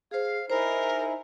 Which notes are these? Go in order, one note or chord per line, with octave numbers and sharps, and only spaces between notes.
G#4 C5 F5
D#4 E4 G#4 A#4 C5